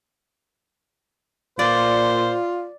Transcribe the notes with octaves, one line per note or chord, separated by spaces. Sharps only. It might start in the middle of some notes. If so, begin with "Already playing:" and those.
A#2 F4 C5 D5